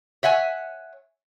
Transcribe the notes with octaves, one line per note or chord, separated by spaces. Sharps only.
C#5 E5 F#5 G#5